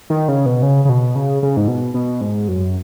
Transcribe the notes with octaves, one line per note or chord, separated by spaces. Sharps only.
D#3
C#3
B2
C#3
C#3
B2
C#3
C#3
G#2
B2
B2
G#2
F#2